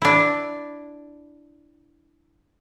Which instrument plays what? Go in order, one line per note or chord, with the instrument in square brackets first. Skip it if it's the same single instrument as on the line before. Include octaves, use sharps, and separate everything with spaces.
[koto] D4 E4